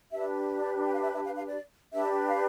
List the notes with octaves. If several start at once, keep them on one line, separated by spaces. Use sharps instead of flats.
D4 G4 B4 E5
D5
G5
F5
E5
E5
F5
F5
D5
D4 G4 B4 E5
F5